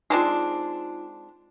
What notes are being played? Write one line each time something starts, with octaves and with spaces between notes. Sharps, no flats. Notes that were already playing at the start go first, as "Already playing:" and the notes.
G#3 C4 D4 D#4 F4